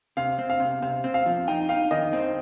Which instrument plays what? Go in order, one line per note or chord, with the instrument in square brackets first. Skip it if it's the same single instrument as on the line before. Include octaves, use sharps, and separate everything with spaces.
[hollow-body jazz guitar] C3 [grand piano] F5
[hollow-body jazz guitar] C4
[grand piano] F5
[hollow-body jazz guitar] C3
[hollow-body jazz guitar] C3 [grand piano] F5
[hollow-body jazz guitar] C4
[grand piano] F5
[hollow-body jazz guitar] F3
[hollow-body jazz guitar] D#4 [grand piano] G5
[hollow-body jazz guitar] D#4 [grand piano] F5
[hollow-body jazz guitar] D#3 [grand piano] D#5
[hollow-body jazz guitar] C4